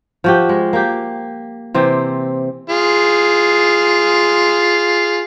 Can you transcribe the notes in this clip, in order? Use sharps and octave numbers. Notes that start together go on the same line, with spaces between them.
F3 F#4 G4
G#3
A#3 G4
C3 E3 C4 G4
F4 G#4